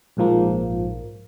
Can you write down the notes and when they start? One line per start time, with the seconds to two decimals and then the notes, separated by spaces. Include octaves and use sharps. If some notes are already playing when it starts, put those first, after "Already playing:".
0.17 A#1 G#2 F3 A#3